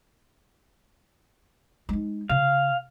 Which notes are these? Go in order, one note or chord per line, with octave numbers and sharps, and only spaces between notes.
G#3 D#4
C#3 F5